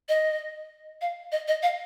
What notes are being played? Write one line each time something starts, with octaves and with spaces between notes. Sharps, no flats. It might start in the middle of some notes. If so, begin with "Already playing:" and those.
D#5
F5
D#5
D#5
F5